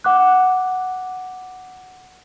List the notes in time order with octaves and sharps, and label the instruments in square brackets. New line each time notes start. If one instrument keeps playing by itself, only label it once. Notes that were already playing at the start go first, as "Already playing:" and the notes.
[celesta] F#5 D6 F#6